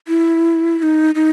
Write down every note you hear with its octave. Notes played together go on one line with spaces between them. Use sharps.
E4
E4
D#4
D#4